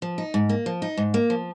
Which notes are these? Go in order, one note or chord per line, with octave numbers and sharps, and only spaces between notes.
F3
D#4
G#2
A#3
F3
D#4
G#2
A#3
F3